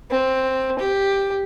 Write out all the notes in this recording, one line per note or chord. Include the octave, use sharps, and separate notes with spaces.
C4
G4